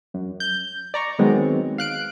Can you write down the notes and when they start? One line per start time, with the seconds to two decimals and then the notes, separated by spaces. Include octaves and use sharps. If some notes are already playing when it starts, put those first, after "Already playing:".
0.14 F#2
0.40 G6
0.94 D5 A#5 C#6
1.19 D#3 F#3 G#3 B3 C4
1.78 F5 F#6 D7